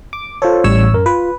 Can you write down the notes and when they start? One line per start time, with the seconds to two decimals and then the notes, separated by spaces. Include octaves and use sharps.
0.13 D6
0.42 F4 A4 C5 C#5
0.64 A1 G3 C#5 E6
0.93 F#2 A#4
1.06 F4 B4